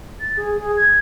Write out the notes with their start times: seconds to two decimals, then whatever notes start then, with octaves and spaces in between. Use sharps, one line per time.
0.20 A6
0.37 G#4
0.57 G#4
0.77 G#6